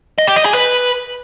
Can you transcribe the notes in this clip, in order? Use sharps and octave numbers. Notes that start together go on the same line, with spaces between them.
D#5
G4
D#5
G#4
B4